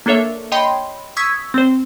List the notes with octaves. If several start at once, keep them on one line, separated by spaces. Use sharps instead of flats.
A#3 D4 A4 C#5 E5
C#5 D#5 G5 B5 C6
C#6 D#6 E6 G#6 B6
C4 C5